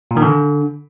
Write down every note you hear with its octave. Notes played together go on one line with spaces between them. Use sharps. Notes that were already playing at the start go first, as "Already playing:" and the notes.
A#2
D#3
D3